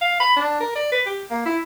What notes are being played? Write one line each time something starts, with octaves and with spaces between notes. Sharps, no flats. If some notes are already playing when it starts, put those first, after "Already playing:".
F5
B5
D4
A#4
D5
B4
G4
A#3
E4